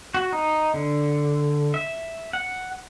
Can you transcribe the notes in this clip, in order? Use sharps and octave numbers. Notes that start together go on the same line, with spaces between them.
F#4
D#4
D3
E5
F#5